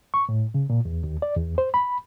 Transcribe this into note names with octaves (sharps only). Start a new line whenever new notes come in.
C#6
A2
C#3
A#2
E2
D#2
D5
E2
C5
B5